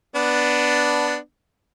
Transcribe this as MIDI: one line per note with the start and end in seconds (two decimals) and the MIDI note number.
0.15 1.16 59
0.15 1.16 62